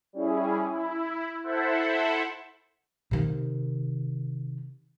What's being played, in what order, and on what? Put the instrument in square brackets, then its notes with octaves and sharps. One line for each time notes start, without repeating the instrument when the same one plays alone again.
[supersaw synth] G3 C#4 E4 G#4
E4
E4 A4 C5 E5 F#5
[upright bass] C3 D#3